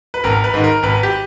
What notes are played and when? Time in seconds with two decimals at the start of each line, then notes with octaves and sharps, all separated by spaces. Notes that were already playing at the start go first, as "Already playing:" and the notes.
0.14 B4
0.24 G#1 A#4
0.44 B4
0.54 G#2 D#3
0.64 A#4
0.83 G#1 B4
1.03 G4